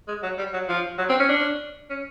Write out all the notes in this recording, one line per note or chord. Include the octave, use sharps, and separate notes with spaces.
G#3
F#3
G3
F#3
F3
F#3
C4
C#4
D4
C#4